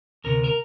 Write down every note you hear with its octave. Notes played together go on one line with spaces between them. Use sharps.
D2 C3 A#4
A#4